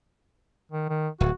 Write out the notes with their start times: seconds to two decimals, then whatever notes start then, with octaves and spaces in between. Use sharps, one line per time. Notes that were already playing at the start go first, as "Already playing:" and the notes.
0.72 D#3
0.89 D#3
1.21 D1 F#4